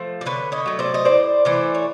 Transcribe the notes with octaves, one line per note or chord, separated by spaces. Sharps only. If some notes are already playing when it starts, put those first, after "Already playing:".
Already playing: F3 A3 C5
D5
D3 B4 C#5
C#5 D#5
F#3 A3
C5 D5
D#5
A2 C5 D5
E3 A3 C5 D5
C#5